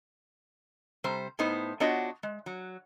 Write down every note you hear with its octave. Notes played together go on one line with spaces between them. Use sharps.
C3 G3 C5
A2 B3 D#4 C5
B3 D4 F4 F#4 C#5 D#5
G#3
F#3